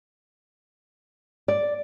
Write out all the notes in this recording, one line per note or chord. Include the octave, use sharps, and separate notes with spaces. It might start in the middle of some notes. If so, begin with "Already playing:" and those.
D5